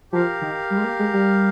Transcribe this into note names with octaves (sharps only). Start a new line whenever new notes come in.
F3 G4 A#4 F5
D#3
G3
G#3
A#3
G#3
G3